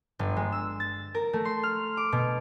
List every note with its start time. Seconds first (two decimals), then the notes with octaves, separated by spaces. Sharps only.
0.19 G1
0.36 G#3
0.52 E6
0.80 A6
1.15 A#4
1.33 A3
1.45 C6
1.63 F6
1.97 D6
2.12 B2